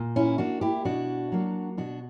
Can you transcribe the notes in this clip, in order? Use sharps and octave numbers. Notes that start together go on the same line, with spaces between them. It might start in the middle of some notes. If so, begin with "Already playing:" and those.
Already playing: A#2
C#4 E4
A#3 D4 F#4
E4 G4
B2 D4 F#4
F#3 A#3
B2 D4 F#4